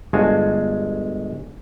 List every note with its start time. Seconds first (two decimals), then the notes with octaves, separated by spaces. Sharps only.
0.13 G1 G#3 F#4 F5 G#5 A5